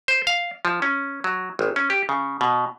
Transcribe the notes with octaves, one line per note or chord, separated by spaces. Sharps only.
C5
F5
F3
C#4
F#3
G#1
C#4
G4
C#3
B2